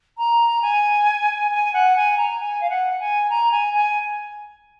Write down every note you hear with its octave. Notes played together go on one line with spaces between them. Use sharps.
A#5
G#5
G#5
F#5
G#5
A#5
G#5
F5
F#5
G#5
A#5
G#5
G#5